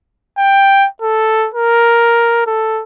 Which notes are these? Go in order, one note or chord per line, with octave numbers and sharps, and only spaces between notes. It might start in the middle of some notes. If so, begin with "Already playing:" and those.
G5
A4
A#4
A4